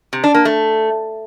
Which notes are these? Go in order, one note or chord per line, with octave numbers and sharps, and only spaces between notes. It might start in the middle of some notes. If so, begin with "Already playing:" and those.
C3
D4
A#3
A3